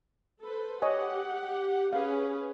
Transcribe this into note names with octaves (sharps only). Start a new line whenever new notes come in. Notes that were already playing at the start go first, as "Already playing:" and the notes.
A4 B4 C5
G4 C#5 D#5 F#5 G#5
C#4 G#4 B4 F5